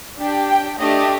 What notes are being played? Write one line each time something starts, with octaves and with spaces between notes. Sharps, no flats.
D4 G4
G5
A3 D4 G4 D#5